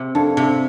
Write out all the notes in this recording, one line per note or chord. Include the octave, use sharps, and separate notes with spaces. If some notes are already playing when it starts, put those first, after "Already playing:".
Already playing: C3
F2 D4
C3